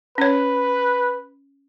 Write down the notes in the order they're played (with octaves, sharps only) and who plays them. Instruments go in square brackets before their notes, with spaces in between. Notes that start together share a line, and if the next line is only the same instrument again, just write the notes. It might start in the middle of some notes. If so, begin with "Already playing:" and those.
[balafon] C#4 C#5 [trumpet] B4